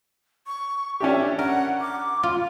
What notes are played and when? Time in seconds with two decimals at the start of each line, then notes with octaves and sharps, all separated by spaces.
0.47 C#6
1.00 C#4 D4 G4 E5
1.39 A#4 F#5
1.81 D6
2.23 F4